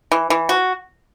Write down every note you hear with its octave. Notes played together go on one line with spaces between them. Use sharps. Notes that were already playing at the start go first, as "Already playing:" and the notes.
E3
E3
F#4